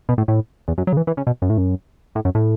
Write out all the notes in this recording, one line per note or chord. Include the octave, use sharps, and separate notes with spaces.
B2
A2
A2
E2
F#2
F#3
C#3
E3
E3
C#3
B2
F#2
A2
F#2
A2
F#2
A2